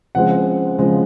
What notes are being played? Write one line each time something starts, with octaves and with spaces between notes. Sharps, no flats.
C#3 F3 G#3 C4 F#5
C#3 F3 G#3 C4